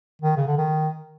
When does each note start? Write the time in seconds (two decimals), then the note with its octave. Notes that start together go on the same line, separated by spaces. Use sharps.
0.22 D#3
0.37 C#3
0.47 D3
0.57 D#3